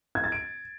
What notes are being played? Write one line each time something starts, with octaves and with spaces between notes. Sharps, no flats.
G#6
A6
D7